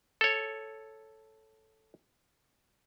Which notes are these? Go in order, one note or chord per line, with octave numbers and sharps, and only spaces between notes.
A4 C#5